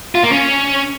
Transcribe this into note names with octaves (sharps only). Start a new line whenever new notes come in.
F4
A#3
C#4